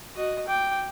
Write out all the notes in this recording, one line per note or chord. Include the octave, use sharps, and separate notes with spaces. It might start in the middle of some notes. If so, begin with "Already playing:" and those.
F#4 D#5
G5 D6